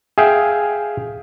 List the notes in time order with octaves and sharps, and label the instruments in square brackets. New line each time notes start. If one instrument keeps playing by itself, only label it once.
[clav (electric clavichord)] G#4 E5 F5 G5